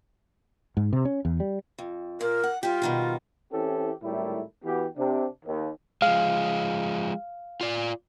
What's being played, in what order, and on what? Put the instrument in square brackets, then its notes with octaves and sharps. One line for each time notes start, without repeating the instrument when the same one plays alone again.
[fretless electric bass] G#2
C3
C#4
E2
G3
[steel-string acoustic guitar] F2
[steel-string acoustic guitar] A#2 [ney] A#4
[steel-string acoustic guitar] F#5
[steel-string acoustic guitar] G3 G4 [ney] F4
[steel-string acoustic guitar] B2 D#3 G3
[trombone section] E3 C4 C#4 E4 G4 A4
G#1 A2 G3 A3 E4 A#4
E3 B3 F#4 G4
C3 D4
D#2
[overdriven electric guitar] F3 G#3 [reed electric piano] F5
[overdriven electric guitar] F4 D5